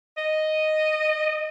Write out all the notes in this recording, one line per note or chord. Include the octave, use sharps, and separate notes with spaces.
D#5